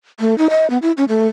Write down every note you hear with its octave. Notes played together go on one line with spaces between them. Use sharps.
A3
D#4
D#5
B3
E4
C#4
A3